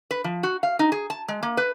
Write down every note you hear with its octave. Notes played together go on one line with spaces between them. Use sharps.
B4
F3
F#4
F5
D#4
G#4
A5
G#3
A#3
B4